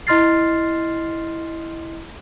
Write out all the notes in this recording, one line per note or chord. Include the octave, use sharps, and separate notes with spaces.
E4 D#5 C6 F6 A6 C7